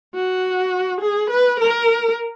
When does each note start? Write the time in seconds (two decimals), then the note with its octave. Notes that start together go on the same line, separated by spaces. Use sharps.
0.15 F#4
1.01 G#4
1.30 B4
1.60 A#4